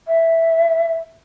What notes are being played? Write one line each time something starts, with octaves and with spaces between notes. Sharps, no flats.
E5